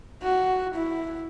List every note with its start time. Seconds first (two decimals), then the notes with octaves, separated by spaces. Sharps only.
0.23 F#4
0.74 E4